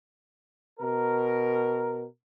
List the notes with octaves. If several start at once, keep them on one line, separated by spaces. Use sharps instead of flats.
B2 A#4